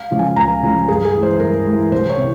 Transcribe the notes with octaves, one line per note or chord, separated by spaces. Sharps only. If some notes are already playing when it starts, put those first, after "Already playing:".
Already playing: F5
C#3 F3 G#3
G#5
C#2 A#5
C#3 F3 G#3
G2 G#4
G#4
E3 G#3
C5
G2 A#4
E3 G#3
C2 C5
C#5
C3 E3